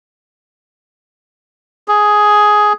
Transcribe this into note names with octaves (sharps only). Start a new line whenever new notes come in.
G#4